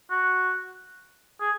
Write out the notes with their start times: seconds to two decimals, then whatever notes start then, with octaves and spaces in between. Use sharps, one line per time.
0.11 F#4
1.41 G#4